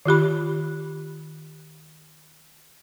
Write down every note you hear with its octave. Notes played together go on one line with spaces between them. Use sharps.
D#3 F4 G4 B5